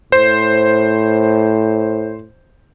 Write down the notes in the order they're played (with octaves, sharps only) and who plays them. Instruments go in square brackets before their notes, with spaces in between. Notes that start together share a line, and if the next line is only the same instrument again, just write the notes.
[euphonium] A2 [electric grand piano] C5